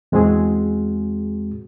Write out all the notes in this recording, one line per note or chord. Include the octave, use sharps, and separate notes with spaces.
E2 G#3 C4 F#4 G#4